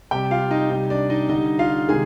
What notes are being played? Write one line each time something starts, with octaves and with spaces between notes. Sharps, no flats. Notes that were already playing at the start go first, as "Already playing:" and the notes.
C3 G3 G4 G5
F4 F5
D#4 D#5
C3 G3 D#4 D#5
D4 D5
D#4 D#5
D3 G3 D#4 D#5
F4 F5
C3 D#3 G#3 G#4 G#5